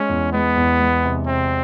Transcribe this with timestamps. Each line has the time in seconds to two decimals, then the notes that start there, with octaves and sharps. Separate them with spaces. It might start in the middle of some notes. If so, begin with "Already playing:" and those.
Already playing: G#3 C#4
0.09 E2
0.33 G#3 B3
0.56 E2
0.80 G#3
1.04 C3
1.26 C3 C4